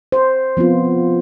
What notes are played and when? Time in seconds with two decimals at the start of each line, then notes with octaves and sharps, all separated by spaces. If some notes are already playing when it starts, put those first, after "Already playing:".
0.12 C5
0.57 F3 B3 C4 F4